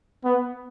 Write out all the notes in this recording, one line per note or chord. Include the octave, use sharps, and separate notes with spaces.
B3